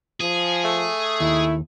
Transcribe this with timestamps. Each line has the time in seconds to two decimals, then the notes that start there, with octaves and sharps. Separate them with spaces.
0.21 F3 G#4
0.64 A3
1.20 D#2 E4